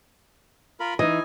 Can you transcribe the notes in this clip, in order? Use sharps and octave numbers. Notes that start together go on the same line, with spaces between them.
F4 A#4 B5
E3 D#4 D#5 G#5